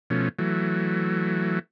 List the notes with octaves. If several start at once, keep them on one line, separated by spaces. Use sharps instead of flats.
B2 F3 A3 C#4
E3 F#3 A3